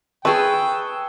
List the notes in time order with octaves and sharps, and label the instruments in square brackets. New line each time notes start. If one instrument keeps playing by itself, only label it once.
[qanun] G#4 B4 [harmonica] G5 [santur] A5 C#6 E6